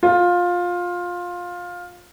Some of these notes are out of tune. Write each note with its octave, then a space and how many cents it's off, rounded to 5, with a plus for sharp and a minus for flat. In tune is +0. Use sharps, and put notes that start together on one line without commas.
F4 +15